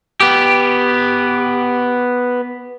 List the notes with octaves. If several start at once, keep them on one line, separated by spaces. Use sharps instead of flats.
B3 G4